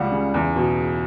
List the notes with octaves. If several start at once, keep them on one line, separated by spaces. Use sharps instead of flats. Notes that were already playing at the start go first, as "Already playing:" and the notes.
Already playing: C#2 G3 F#5
C#3
E2
B2